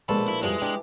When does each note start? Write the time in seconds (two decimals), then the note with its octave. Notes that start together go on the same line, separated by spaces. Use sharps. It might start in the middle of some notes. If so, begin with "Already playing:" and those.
0.08 A#1 B2 G#3 A4 B4 B5
0.28 E4
0.42 F2 E3 G3 G#3 F4
0.62 D4 G4